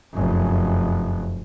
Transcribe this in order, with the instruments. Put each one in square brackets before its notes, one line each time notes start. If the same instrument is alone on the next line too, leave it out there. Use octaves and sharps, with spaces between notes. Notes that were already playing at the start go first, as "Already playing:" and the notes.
[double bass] F1 F#2